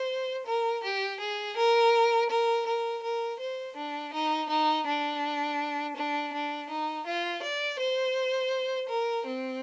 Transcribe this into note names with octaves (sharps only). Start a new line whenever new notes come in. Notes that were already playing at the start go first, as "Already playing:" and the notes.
Already playing: C5
A#4
G4
G#4
A#4
A#4
A#4
A#4
C5
D4
D#4
D#4
D4
D4
D4
D#4
F4
D5
C5
A#4
C4